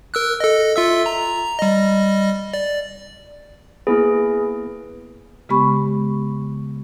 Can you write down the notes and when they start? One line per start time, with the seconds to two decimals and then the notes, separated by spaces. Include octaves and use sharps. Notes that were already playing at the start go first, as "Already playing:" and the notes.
0.14 A#4 E6 F#6
0.40 A4 D#5
0.76 F4 E5 E6
1.06 A#5
1.59 G3 D#5
2.54 D5
3.87 A#3 B3 E4 G#4 B4
5.49 C#3 G#3 B3 G4 B5 C#6